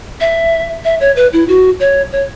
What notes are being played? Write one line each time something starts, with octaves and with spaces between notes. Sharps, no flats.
E5
E5
C#5
B4
E4
F#4
C#5
C#5